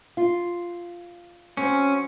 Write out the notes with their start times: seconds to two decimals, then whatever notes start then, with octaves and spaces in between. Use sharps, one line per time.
0.17 F4
1.57 F#3 C4 C#4